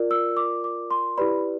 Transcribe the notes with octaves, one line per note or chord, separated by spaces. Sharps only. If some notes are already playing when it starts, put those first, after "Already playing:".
Already playing: F4 A#4 D5
E6
D6
D6
C6
E4 G4 B4 D5 B5